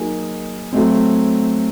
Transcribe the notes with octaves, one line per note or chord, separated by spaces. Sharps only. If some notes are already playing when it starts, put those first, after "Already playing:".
Already playing: F#3 A#3 D#4 G#4
F#3 A3 C4